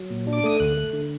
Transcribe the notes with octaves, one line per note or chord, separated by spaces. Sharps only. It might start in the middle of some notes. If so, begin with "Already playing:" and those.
Already playing: F#3
A#2
D4
D6
A3 D#6
D2 F#6
A3
D3